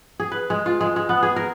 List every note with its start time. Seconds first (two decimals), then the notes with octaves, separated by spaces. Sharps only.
0.20 G#4
0.32 B4
0.50 G#3
0.66 F4
0.81 G#3
0.96 G#3
1.09 B3
1.23 G#4
1.36 A#4